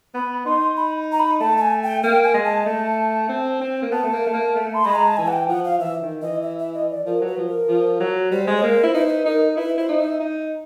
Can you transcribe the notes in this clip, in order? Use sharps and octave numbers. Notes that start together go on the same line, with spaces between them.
B3 B5
D#4 C6
B5
A#5
B5
A3 A5
A5
G#5
G5
A#3 G5
G#5
G#3
A5
A3
C4
C4
A#3
B3 A5
A3
A#3
A3
A#3
A3
C6
G#3 B5
A#5
A5
E3 G#5
F#5
G5
F3 F#5
F5
E3 E5
D#3
E3 D#5
E5
E5
D#5
D5
F3 A#4
F#3
B4
F3
A#4
F3
F#3
G3 C5
G#3
C#5
A#3 C5
E4
D#4 B4
C5
B4
D#4 A#4
E4 B4
E4 C5
D#4
E5
D#4